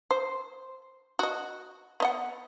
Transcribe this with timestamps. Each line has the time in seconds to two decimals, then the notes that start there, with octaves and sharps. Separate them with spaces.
0.11 C5
1.19 F#4 D#5
2.00 B3 D#5 F#5